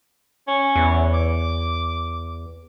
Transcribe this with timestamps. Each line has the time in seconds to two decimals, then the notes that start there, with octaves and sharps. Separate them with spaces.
0.48 C#4
0.76 E2
1.14 D6